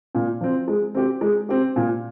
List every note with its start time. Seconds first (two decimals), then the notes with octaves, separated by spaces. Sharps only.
0.15 A#2
0.41 F3 C4
0.68 G#3
0.95 C4 G4
1.21 G#3
1.49 C4 G4
1.76 A#2